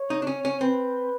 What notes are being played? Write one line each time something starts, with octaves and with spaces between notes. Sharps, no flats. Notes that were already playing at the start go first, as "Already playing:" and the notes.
Already playing: C#5
D#4
D4
C#4
C#4
C4 B4